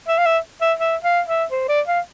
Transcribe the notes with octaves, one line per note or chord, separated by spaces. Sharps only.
E5
F5
E5
E5
E5
F5
E5
C5
D5
F5